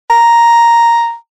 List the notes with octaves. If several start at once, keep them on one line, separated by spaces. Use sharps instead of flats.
A#5